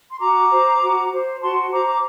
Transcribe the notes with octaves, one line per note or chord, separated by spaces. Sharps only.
C6
F#4 A#5 D6
C5
F#4
C5
F#4 A5 C6
C5 A#5 D6
A#5 D6